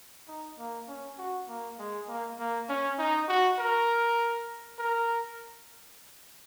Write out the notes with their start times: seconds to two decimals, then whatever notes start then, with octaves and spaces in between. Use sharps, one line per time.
0.28 D#4
0.58 A#3
0.88 C#4
1.18 F#4
1.48 A#3
1.79 G#3
2.08 A#3
2.39 A#3
2.69 C#4
2.98 D#4
3.28 F#4
3.59 A#4
4.79 A#4